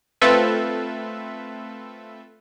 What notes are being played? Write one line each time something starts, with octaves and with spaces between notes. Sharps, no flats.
A3 C4 F4 A4 B4 E5